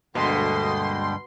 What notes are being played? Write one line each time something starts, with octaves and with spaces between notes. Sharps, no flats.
D2 G2 B2 D3 G#3 A#3 G5 C6